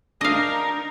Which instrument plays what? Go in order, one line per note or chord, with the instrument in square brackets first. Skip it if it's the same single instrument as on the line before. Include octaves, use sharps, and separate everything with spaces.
[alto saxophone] D4 [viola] D#4 A#4 [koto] D#5 F5